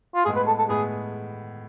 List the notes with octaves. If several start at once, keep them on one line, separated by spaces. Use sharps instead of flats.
F4
A2 G#3 B3 G#4
B4
A4
A4
A2 G#3 B3 G#4